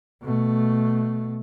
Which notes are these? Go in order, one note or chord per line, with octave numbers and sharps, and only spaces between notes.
B2 A3